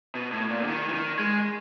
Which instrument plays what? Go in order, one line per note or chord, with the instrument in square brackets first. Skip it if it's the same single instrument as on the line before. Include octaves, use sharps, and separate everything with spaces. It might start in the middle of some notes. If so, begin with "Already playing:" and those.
[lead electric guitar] B2
A2
A#2
D3
D#3
E3
D#3
G#3